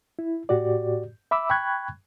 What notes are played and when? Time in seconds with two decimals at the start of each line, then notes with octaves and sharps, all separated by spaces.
0.19 E4
0.49 A2 F#4 G4 D5
1.31 E5 B5 D6 E6
1.50 G5 B5 C#6 F#6 G#6